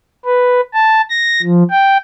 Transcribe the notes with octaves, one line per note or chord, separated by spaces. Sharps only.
B4
A5
A#6
F3
G5